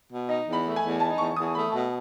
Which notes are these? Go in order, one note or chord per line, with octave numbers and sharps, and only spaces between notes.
B2
D#4 D#5
E2
B5
A3
G#5
E2
D#4 A5
E2 C#6
E2 D#6
A3 B5
B2 A5